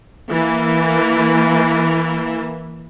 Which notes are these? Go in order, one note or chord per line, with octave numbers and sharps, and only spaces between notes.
E3 A#3